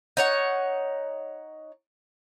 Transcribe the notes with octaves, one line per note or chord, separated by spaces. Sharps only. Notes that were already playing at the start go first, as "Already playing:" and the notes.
D#4 C#5 F#5